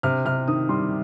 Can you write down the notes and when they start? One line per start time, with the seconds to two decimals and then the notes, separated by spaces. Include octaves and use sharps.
0.03 C3 F6
0.25 C3 F6
0.48 D#3 D#6
0.69 G3 C6